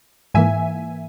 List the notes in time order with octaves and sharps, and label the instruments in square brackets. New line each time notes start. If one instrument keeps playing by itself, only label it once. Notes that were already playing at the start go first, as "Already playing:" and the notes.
[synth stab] G#2 E3 A#3 E5 G#5